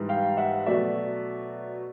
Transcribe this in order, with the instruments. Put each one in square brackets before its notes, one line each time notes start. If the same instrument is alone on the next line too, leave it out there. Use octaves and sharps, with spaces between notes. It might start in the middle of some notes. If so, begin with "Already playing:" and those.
Already playing: [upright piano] G#2 E3 G3
F5 G5
E5 F#5
B2 F#3 A3 D5 E5